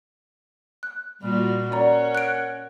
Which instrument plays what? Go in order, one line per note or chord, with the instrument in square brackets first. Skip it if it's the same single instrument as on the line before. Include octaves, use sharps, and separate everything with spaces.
[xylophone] F#6
[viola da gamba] A#2 F4 F#4 [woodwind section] G3
[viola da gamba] C#4 [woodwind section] A#4 C#5 F#5 [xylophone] D5 A#5
[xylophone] F#6 D7